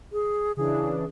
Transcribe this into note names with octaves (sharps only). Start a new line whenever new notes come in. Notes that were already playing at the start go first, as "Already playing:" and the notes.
G#4
C#3 E3 D4 G#4